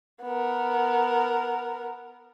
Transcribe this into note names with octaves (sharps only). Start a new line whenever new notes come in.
B3 A#4